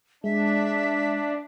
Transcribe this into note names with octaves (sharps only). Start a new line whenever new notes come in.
G#3 D4 E5